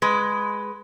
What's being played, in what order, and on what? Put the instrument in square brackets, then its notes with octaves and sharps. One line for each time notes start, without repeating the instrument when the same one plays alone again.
[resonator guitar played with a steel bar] G#3 B4